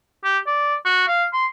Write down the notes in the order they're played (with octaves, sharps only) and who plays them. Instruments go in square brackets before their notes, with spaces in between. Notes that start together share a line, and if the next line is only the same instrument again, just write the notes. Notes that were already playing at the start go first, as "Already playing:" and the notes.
[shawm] G4
D5
F#4
F5
C6